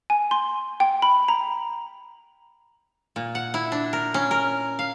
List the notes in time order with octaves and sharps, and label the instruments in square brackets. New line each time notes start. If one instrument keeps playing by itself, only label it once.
[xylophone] G#5
C6
G5
B5
A#5
[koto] A#2
F#5
E4
D4
A#4
C#4
A#4
F5